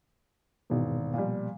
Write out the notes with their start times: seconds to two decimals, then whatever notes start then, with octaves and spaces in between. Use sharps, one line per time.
0.70 D#1 G#1 E2 B2 B3
1.14 A#2 F3 G3